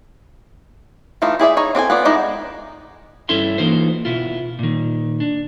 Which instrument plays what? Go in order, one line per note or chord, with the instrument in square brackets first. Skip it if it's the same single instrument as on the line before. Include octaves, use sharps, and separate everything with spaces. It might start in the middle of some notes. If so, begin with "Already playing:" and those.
[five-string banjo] E3 A3 D#4 F4
E4 G#4 D5 E5
D#4 C#5
C4 D4 A4 G#5
B3 F4 D5
G#3 B3 D#4 E4 D5
[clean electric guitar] G2 C#4 E4 A4 E5 C6
E3 A#3 D#4 F4 C5
B2 E4 F4
A#2 D#3
D4